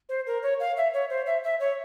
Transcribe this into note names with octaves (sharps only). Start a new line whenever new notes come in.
C5
A#4
C#5
F5
E5
C#5
C5
E5
E5
C#5